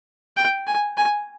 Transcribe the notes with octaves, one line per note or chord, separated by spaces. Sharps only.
G5
G#5
G#5